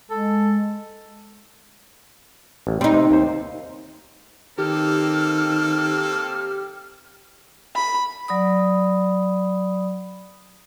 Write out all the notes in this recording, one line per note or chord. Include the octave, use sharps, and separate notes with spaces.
G#3 A4
A1
G3 C4 D#4
C3
D#2 C5
D#3 A#3 C4 G4 A4 F6
B5
F#3 D5 B5 D#6